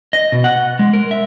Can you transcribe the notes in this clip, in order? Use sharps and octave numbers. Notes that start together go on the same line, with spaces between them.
D#5
B2
F#5
G#3
A#4
E5